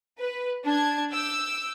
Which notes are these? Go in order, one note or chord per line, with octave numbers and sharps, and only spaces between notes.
B4
D4 A5 G#6
D6 E6 G6